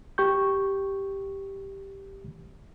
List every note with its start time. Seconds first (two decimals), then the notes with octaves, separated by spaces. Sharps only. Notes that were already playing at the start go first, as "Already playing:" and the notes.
0.18 G4 C#6 G6